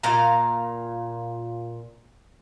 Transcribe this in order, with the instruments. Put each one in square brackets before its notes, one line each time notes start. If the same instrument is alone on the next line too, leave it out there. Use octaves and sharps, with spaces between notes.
[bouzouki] A#2 F5 A#5